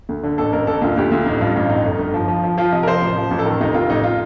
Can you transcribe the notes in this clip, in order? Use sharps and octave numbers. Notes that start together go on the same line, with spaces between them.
D2
D3
A1 A4
A1 A#4
A1 A4
D2 F4
D2 G4
D2 F4
A1 D#4
G2 F4
A1 F4
F2 D#4
G1
G1
F3
F3
F3
F3 F4
C3 D#5
A#4
F3 C5
A1
F3
A1
A4
D#3 A#4
F1 D#4
F1 F4
A1 D#4
F4